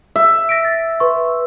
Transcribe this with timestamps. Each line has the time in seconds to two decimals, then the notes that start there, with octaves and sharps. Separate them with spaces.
0.16 E5
0.49 A#6 B6 D7
0.65 A6
1.00 B4 C6 C#6